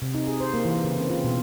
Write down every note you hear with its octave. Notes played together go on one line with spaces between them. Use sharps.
C3
D#4
G#4
C5
A#3
E3
C#3
C4
F4
B2